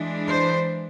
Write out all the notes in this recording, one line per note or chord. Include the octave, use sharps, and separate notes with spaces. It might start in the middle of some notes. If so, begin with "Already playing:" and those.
Already playing: E3 G#3 D4
C5